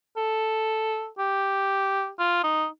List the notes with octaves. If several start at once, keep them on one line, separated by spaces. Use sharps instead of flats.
A4
G4
F4
D#4